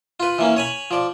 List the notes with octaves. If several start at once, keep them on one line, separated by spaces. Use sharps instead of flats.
F4 B4
E3 A#3 C#4
C#5 G#5 B5
F3 D5